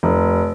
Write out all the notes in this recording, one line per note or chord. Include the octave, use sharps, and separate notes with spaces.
F1